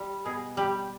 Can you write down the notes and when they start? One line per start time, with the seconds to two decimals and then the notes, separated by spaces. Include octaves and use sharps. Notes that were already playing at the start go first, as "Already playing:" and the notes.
Already playing: G3
0.25 B2 G#4
0.57 G3 G4